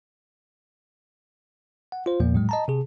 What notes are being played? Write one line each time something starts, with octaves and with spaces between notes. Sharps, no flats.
F#5
F4 C5
E2 A#2 F3 A#3
A2 F#3 G#3
D#5 A5 A#5
C3 G#4